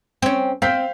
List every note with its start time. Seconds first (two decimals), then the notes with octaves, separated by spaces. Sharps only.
0.22 C4 C#4
0.62 C4 F5 G6 B6